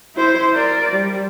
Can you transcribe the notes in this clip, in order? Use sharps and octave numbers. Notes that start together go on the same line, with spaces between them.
E4 C5
A#4 D5
G3